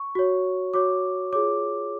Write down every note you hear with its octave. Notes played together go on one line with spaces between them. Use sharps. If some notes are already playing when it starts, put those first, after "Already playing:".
Already playing: C#6
F#4 C#5
F#4 C#5 D6
F4 G#4 C#5 D6